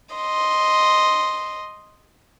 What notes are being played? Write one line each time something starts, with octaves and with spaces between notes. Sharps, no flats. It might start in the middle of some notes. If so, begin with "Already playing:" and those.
D#5 C6